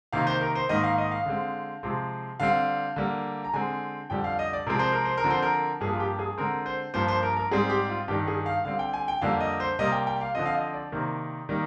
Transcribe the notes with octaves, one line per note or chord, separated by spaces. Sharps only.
C3 D#3 A#3 F5
C5
A#4
C5
G#2 D#3 A#3 D#5
F5
D#5
F5
D3 G#3 C4
C3 F3 G#3 C4
D3 G3 C4 F5
D3 G3 A#3
A#5
D3 G#3 C4 G#5
F2 D3 G3 G5
F5
D#5
D5
C3 F3 G#3 C4 A#4
C5
A#4
C5
A#4
D3 F3 C4
C5
A#4
G2 F3 A#3 G#4
F4
G4
G#4
D3 G#3 C4 A#4
C5
G2 F3 A#3 C5
C5
A#4
A#4
G#2 G3 C4 G#4
G4
F4
G2 D#3 G3 G4
G#4
F5
D3 G3 C4 F5
G5
G#5
G5
F2 D3 G3 A#3 F5
D#5
C5
C3 G3 A#3 D#5
G5
G5
F5
D3 F3 C4 D#5
F5
D#5
D5
C3 D#3 A#3
D#3 G3 A#3